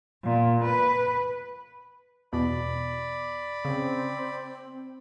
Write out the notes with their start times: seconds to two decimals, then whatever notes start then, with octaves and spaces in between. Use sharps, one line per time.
0.24 A#2
0.64 B4
2.33 E2 B2 D5 B5
3.65 C#3 C4